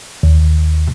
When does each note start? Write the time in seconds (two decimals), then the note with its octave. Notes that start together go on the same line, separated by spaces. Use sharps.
0.23 D#2